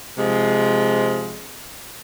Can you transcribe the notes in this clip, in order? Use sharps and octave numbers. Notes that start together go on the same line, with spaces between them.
C3 F3 G#3